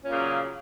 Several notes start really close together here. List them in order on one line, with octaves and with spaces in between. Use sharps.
A#2 C#4 A#3 C#3 F#3